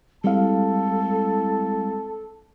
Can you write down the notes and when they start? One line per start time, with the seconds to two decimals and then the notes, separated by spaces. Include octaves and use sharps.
0.24 G3 G#3 C4 E4 A4 F5 A5